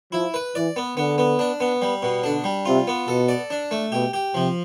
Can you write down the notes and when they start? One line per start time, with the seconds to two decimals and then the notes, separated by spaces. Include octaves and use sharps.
0.12 F3 E4
0.34 B4
0.55 E3 D5
0.76 B3
0.96 D3 B3
1.18 B3
1.39 D4
1.60 B3
1.82 G3
2.02 B2
2.23 D3 D4
2.44 G3
2.65 C3 F4
2.87 B3
3.08 B2 A4
3.29 D5
3.50 D4
3.71 A3
3.92 B2 G4
4.13 G4
4.34 C3 F3